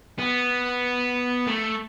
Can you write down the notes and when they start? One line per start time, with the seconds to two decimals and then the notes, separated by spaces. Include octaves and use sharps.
0.19 B3
1.47 A3